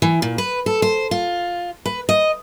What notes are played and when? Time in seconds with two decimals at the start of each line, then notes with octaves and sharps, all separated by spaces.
0.02 E3
0.22 A#2
0.38 B4
0.66 A4
0.82 C5
1.11 F4
1.86 B4
2.09 D#5